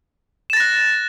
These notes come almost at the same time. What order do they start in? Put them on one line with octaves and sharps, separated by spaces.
E7 A6 A#6 F#6